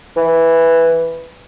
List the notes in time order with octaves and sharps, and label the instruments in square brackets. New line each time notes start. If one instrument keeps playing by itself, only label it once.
[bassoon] E3